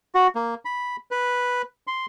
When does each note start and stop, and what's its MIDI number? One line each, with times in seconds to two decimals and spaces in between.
0.15 0.27 66
0.35 0.55 58
0.65 0.96 83
1.11 1.62 71
1.87 2.06 84